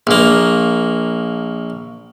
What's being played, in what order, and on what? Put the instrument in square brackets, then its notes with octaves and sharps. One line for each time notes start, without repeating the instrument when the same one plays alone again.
[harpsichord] A#1 A#3